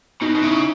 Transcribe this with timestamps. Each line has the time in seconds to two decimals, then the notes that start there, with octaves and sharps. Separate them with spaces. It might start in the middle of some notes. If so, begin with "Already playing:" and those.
0.22 B2 D#4
0.35 B2
0.42 C#3 E4